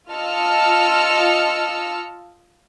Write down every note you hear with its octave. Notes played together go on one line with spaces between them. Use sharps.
F4 D#5 A5 E6 F6 C#7